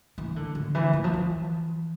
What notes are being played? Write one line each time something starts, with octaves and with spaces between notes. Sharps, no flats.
E3
D3
D3
E3
E3
F3
E3